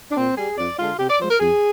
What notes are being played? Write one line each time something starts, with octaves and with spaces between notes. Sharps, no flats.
D4
A#2 C4
G3 G#4
F2 D5
D3 G#3 F4
C3 G4
D5
F3 G#3 C5
A#4
F2 G#4